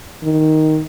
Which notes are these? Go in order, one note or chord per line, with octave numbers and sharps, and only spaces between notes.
D#3